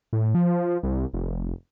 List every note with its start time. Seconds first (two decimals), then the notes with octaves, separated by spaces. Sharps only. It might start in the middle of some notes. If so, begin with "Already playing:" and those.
0.13 A2
0.34 F3
0.83 C2
1.14 F1